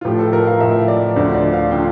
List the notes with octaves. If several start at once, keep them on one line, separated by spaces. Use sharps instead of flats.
F4
A2 F3 G4
A4
A#4
F5
A2 F3 E5
D5
D2 D3 F3 C5
D5
F5
D3 F3 G5